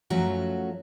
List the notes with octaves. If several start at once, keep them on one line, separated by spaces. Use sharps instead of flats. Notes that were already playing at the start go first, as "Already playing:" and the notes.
F#2 F3 F#3 A3 C#4 F#4